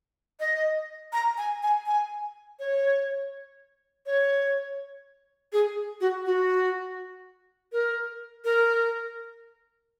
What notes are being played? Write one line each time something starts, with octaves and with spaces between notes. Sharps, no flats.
D#5
A#5
G#5
G#5
G#5
C#5
C#5
G#4
F#4
F#4
A#4
A#4